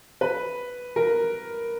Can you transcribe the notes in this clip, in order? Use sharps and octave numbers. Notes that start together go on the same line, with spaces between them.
B4
A#4